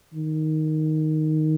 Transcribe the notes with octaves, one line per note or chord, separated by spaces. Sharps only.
D#3